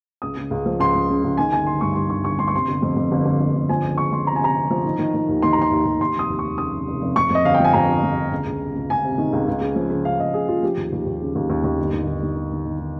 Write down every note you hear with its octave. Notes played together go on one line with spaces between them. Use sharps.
C#2 D#6
C#3
C#2
F3
C#2 C6
F3
C#3
C#2
D#3 G#5
G1 G#5
G1 C6
G2 C#6
G2 C6
G1 C#6
G1 C#6
G2 C6
C#6
C3 C6
G1
F2
F2
G1
G1
G1
G1
F3 G#5
C#2
C#2 C#6
F3 C6
C3 A#5
G#5
C3 A#5
C3
F3
D#3
D#3
D#3
D#2
D#3 C6
A#5
D#3 C6
D#2
D#2
D#2 C6
F1 D#6
D#2
C#6
F1
C#3 D#6
F1
F1
F1
F2 C#6
F2 D#5
G1 F5
G5
F3 G#5
F2 A#5
G1
F3
G1
C#2
C#2
C3
C#2
C#2 G#5
C3
D#3
C#2
C#2
C#3
F3
C#3
C#2 F5
C#2 D#5
C#3 G#4
F3 F4
F3 G4
D#2
D#2
D#2
C#3
D#2
D#2
D#2
G1
D#3
D#3
D#3
G1
D#3
D#3
D#3